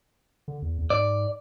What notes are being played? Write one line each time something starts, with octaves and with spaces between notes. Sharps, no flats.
D3
E2
E2
G#2 D5